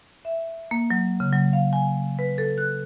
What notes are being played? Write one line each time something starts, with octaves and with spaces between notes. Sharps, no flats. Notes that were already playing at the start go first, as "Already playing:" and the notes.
E5
A#3
F#3
C#3
F#3
F5
G#5
B4
A4
F#6